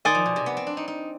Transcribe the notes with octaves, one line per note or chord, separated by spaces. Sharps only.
D#3 D5 G#5 C6 D#6
F3
B2
C3
B3
C4
D4
D#4
D#4